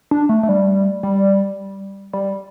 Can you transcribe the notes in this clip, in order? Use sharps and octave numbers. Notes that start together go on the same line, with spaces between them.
D4
A3
A3
G3
G3
G3